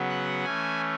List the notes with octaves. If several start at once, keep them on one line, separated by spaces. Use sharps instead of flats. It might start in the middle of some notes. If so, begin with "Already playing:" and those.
Already playing: C#3 F#3 B3
F#5
E3 A3 C#4 G#5